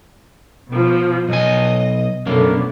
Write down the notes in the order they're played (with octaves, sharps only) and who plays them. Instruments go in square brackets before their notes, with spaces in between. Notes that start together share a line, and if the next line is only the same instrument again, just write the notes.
[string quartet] B2 F3
[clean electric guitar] B1 G#5 [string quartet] D#5
[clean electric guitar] F#2 A#3 [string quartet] B2 D3 A3